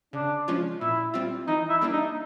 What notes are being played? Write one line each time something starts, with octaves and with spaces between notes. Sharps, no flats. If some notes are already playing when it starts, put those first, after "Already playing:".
C#3 D4
F3 G#3 C#4 F4
A#2 E4
G3 C4 F4
E3 D#4
E4
G3 A#3 D4
D#4